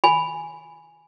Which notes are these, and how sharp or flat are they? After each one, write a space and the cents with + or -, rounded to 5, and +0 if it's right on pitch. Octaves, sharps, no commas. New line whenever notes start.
G#5 +0 B5 +0